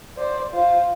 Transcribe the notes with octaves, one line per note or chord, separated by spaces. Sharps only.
C5 D5
F4 C5